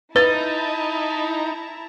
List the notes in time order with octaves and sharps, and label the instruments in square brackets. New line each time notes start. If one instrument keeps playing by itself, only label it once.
[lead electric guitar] D#4 [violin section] E4 A5 A#5 [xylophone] B4 [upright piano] A6